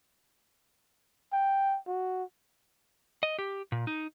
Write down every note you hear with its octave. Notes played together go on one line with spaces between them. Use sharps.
G5
F#4
D#5
G4
A#2
D#4